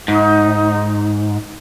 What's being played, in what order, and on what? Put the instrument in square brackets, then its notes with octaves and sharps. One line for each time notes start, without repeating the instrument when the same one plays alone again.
[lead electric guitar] G#2 [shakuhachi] D#4